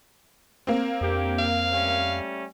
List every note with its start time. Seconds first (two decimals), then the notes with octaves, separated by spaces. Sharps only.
0.67 A#3 C4
1.01 F2 D4 G4
1.39 F5
1.71 G3 A3 C#4